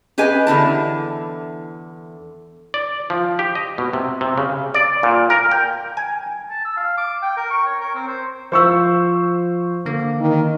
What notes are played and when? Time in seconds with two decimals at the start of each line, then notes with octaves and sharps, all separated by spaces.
0.18 G4 G#4 B4 D#5 G#5
0.47 E2 D3 E4 A5
2.74 D5
3.10 F3
3.39 G4
3.55 D#5
3.78 B2
3.93 C3
4.21 C3
4.38 C#3
4.74 D5
5.03 A#2
5.30 A#4
5.51 G5
5.97 G#5
6.50 A5
6.65 E6
6.77 F5
6.98 D6
7.22 G5
7.37 A#4
7.50 C#6
7.66 C#5
7.81 A#4
7.95 C4
8.08 C5
8.52 F3 F4 C5 C#6 E6
9.86 D3 A#3
10.20 D#3